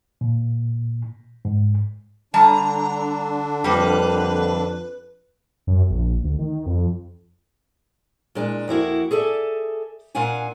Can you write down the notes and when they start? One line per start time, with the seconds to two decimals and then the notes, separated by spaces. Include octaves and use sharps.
0.21 A#2
1.45 G#2
2.34 D3 G3 D4 A5 A#5
3.64 F2 G3 A#3 B4
5.67 F#2
5.90 A#1
6.24 D2
6.39 D#3
6.66 F2
8.35 A#2 G#3 D4
8.68 F2 A#3 E4 F#4
9.11 G#4 A4 D5 E5
10.15 A#2 D4 F5 F#5 G#5